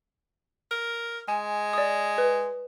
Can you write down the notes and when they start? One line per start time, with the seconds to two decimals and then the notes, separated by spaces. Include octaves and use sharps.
0.71 A#4
1.28 G#3 G#5
1.73 D5 D#6
2.18 B4